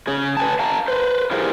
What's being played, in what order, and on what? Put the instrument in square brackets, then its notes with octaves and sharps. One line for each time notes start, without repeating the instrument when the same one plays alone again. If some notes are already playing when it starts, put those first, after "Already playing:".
[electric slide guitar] C#3 C#4 G#4
B4 G#5 A5
F5 A5 A#5
B4 C5
E4 G4 G#4 A#4 C5 F5